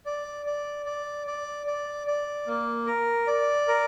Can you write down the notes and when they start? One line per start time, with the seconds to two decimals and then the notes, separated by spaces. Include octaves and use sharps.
0.06 D5
0.46 D5
0.86 D5
1.27 D5
1.66 D5
2.07 D5
2.47 A#3
2.86 A#4
3.27 D5
3.68 A#4